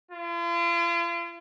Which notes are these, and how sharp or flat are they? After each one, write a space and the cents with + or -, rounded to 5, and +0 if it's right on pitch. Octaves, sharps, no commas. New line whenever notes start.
F4 -40